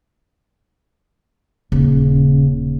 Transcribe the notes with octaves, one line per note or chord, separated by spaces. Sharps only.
D#1 C#3